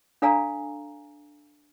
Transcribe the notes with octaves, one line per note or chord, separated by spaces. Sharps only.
D4 A4 D5 F5 G#5 A#5